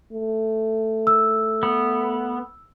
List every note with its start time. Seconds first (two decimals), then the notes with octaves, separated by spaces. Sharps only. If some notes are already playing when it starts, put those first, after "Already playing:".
0.13 A3
1.07 E6
1.63 B3